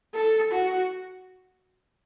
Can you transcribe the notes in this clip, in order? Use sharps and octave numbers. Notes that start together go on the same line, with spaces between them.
A4
F#4